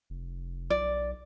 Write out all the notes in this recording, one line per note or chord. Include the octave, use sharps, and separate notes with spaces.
F1
B1 D5